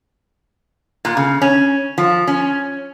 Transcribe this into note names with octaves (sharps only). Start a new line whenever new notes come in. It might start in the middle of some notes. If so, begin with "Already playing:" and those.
A#2
C#3
C#4
F3
C#4